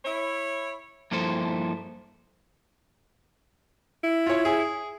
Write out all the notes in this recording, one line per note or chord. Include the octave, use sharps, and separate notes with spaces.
E4 C#5
G2 F3 A#3 E4 A4 C5
E4
F4 C#5
G#4